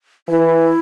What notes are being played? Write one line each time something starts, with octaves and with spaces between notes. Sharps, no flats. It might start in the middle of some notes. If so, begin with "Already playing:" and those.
E3 E4